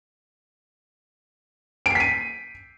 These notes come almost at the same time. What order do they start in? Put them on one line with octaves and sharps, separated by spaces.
D7 C7 B6 D#7